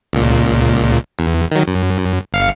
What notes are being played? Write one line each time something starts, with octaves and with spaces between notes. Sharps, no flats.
C#2 A#2
E2
D#3 F#3
F#2
G1 F5 C#7